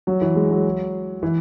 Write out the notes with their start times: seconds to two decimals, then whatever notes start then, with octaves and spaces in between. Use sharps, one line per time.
0.07 F#3
0.21 E3
0.36 G#3
0.51 F#3
1.23 E3